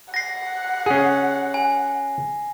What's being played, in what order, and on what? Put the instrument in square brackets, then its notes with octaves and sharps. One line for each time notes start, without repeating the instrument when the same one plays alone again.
[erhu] F#5 [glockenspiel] A#6 C7
[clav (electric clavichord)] C#4 G#4
[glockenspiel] G#5